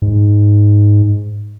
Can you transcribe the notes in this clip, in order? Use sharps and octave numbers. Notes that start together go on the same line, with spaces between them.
G#2